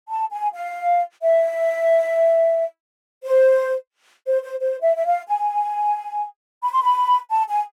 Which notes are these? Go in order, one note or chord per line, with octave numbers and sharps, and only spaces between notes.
A5
G#5
F5
E5
C5
C5
C5
C5
E5
E5
F5
G#5
B5
C6
B5
A5
G#5